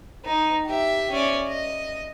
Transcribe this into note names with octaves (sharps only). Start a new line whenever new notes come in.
D#4
G4 E5
C#4 D5
D#5